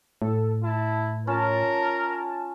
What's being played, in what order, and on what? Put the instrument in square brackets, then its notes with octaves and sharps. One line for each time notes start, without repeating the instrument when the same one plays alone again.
[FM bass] A2 [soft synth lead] A4
[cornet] E4 [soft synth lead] A5
[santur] C#4 F4 [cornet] A#4 [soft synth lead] A5